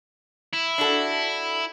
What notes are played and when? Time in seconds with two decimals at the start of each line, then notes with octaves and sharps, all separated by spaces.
0.53 E4
0.78 D4 F#4 A4